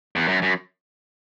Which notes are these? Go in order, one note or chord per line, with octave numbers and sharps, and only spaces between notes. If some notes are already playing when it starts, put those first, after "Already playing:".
E2
F#2
F#2